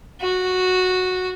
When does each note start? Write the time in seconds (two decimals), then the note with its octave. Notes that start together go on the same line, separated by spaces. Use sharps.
0.21 F#4